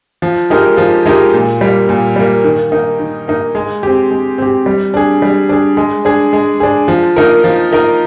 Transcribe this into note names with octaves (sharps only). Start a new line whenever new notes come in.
F3
G#3 D#4 G4 A#4
F3
G#3 D#4 G4 A#4
A#2
G3 A#3
A#2
G3 A#3
D#3
A#3 D#4
D#3
A#3 D#4
G#3
C4 G4
G#3
C4 G4
G3
D4 G#4
G3
D4 G#4
G#3
D4 G#4
G#3
D4 G#4
F3
A#3 D#4 A#4
F3
A#3 D#4 A#4